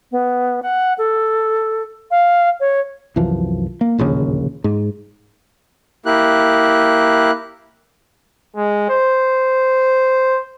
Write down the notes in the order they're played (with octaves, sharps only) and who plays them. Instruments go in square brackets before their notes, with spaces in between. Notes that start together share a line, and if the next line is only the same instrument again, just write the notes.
[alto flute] B3
F#5
A4
F5
C#5
[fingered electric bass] C2 F#2 E3 F3
A#3
D1 A#1 D#2 C#3
G#2
[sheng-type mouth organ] A#3 E4 G4 F#6
[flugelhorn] G#3
C5